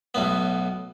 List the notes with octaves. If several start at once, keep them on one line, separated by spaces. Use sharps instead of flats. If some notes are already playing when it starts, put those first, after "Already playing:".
B1 A2 B3